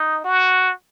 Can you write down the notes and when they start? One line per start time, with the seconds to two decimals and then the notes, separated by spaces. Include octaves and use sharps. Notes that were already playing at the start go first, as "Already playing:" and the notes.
Already playing: D#4
0.25 F#4